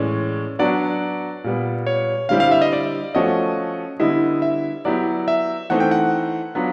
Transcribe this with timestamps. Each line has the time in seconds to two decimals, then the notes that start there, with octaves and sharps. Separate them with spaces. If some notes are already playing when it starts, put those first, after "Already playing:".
Already playing: A2 E3 G#3 C#4 D5
0.59 F#3 B3 D4 F#4 D5
1.44 A#2 G3 B3
1.87 C#5
2.29 D3 G3 C4 E4 G4 F5
2.40 F5
2.51 E5
2.62 D#5
2.73 D5
3.15 F3 A3 C#4 F#4 D#5
4.00 D3 G3 B3 E4 D#5
4.42 E5
4.85 F#3 B3 E4 G4 D5
5.28 E5
5.70 E3 A3 C4 D#4 F#5
5.80 G5
5.91 F#5
6.55 F#3 B3 D4 F4